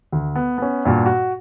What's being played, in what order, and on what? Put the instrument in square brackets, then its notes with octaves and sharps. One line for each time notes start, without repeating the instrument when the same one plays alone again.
[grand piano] D2
B3
B3 C#4
G2 A#2 F#4
F#4